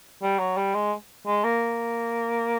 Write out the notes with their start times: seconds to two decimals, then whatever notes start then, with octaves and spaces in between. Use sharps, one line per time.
0.22 G3
0.39 F#3
0.57 G3
0.75 G#3
1.27 G#3
1.44 A#3